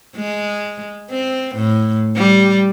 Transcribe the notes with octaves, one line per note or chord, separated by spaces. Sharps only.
G#3
C4
A2
G3